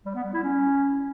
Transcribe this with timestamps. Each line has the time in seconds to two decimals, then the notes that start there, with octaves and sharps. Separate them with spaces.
0.05 G3
0.15 B3
0.24 G3
0.34 E4
0.43 C#4